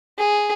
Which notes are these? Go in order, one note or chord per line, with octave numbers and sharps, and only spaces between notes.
G#4